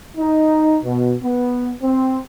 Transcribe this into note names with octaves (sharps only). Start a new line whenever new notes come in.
D#4
B2
B3
C4